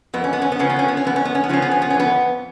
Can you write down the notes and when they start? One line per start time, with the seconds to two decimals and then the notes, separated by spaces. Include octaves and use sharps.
0.14 F2 B3
0.24 C#4
0.33 B3
0.42 C#4
0.52 B3
0.59 C#3 F3 C#4
0.70 B3
0.79 C#4
0.88 B3
0.97 C#4
1.05 F2 B3
1.16 C#4
1.25 B3
1.35 C#4
1.44 B3
1.49 C#3 F3 C#4
1.62 B3
1.71 C#4
1.82 B3
1.90 C#4
1.94 F2
2.00 B3